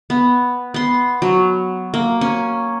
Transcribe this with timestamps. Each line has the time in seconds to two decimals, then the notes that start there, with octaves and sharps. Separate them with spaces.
0.10 B3
0.74 B3 C6
1.22 F#3
1.94 A#3
2.21 C#4